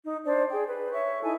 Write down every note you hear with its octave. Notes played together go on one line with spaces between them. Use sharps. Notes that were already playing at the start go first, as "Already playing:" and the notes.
D#4
D4 C5 D5
G#4 G5
B4
C#5 E5 C#6
D#4 E4 A4 G#5